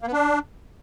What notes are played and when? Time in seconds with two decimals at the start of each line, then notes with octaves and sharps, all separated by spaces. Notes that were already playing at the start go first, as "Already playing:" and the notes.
0.02 A#3
0.07 B3
0.13 D4